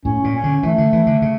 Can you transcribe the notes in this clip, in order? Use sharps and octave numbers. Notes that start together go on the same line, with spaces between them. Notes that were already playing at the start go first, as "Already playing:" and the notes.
A2 C#4
A#2
C#4
D3
E3 A3
D3
E3
D3
C#3